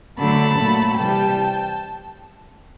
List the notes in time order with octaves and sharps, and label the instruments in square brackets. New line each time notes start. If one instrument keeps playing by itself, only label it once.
[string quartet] D3 F#3 A3 A5 B5
A#2 F#3 A3
C3 E3 G3 G5 A5